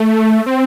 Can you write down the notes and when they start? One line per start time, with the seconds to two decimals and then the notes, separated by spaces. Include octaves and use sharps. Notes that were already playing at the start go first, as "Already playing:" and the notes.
Already playing: A3
0.46 C4